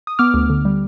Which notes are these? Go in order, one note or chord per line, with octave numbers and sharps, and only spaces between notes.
D#6
B3 D6 F6
D2
D3
G3